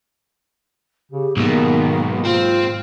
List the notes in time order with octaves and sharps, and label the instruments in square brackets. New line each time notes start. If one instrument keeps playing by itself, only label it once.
[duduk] C#3 [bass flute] G4
[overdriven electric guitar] B1 B2 [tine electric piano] G#2 G#3 [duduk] D#3 [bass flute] A#3
[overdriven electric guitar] C4 [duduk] F4